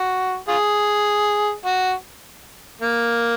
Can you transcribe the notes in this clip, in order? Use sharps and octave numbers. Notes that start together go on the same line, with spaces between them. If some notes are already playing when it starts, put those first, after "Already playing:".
Already playing: F#4
F4 G#4
F#4
A#3